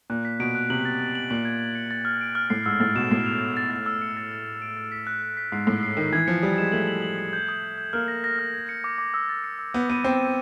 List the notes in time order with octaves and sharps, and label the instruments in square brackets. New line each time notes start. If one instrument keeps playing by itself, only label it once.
[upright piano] A#2 [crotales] F#6
[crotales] B6
[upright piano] B2 [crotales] D7
[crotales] F#6
[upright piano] C3 [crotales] F#7
[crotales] A6
A6
F#7
[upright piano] A#2 [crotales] F#7
[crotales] G#6
G#6
C#7
A6
F6
D7
F6
[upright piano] A2 [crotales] C7
[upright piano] G#2 [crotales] E6
[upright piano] A2 [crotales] A6
[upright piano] B2 [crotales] E7
[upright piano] A2 [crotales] C7
[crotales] F7
A6
A6
A6
E6
C#7
A6
A6
A6
D7
A6
B6
F#6
F#6
B6
[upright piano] G#2 [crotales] C7
[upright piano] A2 [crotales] C7
[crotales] C7
[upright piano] D#3 [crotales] C7
[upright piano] E3 [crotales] G#6
[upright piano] F3 [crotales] C#7
[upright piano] G3 [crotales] D#6
[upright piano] G#3 [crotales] E7
[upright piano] A3 [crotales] F#7
[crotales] F#7
F#7
C#7
G6
D#6
G6
G6
[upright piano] A#3 [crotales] F6
[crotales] A#6
A#6
F6
G#6
C#7
D6
D6
E6
A6
C#7
E6
[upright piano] B3 [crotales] G6
[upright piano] B3 [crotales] D#7
[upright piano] C4 [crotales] D#7
[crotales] D#7